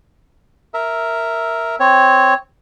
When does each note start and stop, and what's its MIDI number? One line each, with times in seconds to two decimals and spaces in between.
0.74 1.76 70
0.74 1.76 76
1.80 2.34 60
1.80 2.34 73